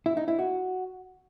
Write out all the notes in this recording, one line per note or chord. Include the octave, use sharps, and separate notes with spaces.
E4
D#4
E4
F#4